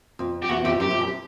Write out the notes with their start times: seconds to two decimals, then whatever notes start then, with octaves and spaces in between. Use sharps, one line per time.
0.19 F2
0.42 G4
0.49 E2 F#4
0.65 F2 G4
0.80 F#2 G4
0.91 F2
1.01 F#2